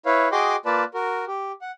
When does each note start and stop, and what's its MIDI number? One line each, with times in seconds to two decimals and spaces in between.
0.06 0.28 64
0.06 0.28 71
0.06 0.28 73
0.06 0.28 77
0.32 0.56 66
0.32 0.56 68
0.32 0.56 75
0.32 0.56 79
0.32 0.56 84
0.32 0.56 86
0.65 0.84 58
0.65 0.84 65
0.65 0.84 71
0.65 0.84 74
0.65 0.84 81
0.94 1.25 66
0.94 1.25 70
1.27 1.52 67
1.62 1.71 78